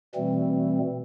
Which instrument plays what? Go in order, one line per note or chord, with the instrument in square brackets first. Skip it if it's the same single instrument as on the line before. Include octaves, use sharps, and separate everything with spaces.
[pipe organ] B2 E3 G3 A3 C4